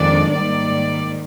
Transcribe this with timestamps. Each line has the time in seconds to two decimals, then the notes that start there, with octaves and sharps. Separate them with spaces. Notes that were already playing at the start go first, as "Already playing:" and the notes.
Already playing: F2 D#3 G#3 D4 D5
0.32 G#2 D#3 G3 A#3 D5